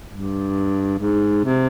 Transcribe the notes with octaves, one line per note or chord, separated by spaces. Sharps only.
G2
G#2
C3